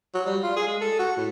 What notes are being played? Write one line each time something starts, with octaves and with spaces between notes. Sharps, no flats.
F#3
G3
F4
G#4
G#3
A4
F#4
A2